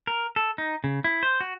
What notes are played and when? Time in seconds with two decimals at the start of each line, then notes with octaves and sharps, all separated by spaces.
0.07 A#4
0.36 A4
0.58 D#4
0.84 C#3
1.04 E4
1.23 C5
1.41 F#4